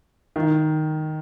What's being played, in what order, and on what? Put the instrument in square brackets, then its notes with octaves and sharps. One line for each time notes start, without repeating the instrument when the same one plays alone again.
[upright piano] D#3